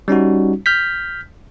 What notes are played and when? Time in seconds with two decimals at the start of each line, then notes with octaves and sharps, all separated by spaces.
0.08 G3 C#4 D#4 F#4
0.66 F6 G6 B6